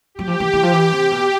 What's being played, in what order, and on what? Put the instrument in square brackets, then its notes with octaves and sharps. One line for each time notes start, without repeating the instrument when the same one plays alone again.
[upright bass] F#3 [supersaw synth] G4
[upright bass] F3
E3
E3
F3
E3
C3
B2